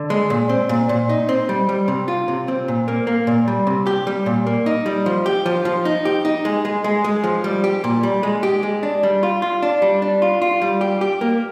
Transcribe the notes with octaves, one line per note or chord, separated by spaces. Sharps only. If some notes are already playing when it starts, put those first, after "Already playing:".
Already playing: D3
G#3
A#2
C4
A#2
A#2
D#4
C4
G3
G3
C3
F4
C3
C4
A#2
A#3
A#3
A#2
G3
C3
G4
G3
A#2
A#3
D#4
G3
F3
G4
F3
F3
D#4
G4
D#4
G#3
G#3
G#3
G#3
F3
G3
G4
A#2
G3
G#3
G4
G#3
D4
G3
F4
F4
D4
G3
D4
F4
F4
G3
G4
G4
A#3